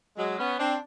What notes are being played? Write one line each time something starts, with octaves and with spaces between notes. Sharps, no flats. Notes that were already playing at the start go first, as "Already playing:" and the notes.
F#3 G#3
B3 C#4
C4 D4